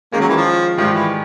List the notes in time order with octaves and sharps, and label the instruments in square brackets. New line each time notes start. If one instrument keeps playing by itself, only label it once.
[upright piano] D#3 G#3 C#4 [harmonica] A#3
[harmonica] F#3
E3
F3
[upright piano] G#2 D#3 G3 [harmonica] F3
[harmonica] E3